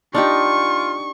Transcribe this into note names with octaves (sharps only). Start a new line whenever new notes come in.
D4 D#4 F4 G4 C#6